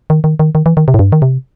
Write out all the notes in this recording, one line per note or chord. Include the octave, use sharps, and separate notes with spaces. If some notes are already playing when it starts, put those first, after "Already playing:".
D#3
D#3
D#3
D#3
E3
D#3
C3
A2
G2
D#3
C3